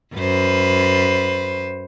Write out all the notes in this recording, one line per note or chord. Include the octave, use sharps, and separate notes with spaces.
F#2 B4 C5